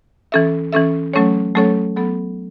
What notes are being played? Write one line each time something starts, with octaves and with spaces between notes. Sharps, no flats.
E3 C#4 A4 E5
E3 C#4 A4 E5
F#3 A3 C#4 A4 C#5
F#3 A3 C#4 A4 C#5
F#3 B3 A4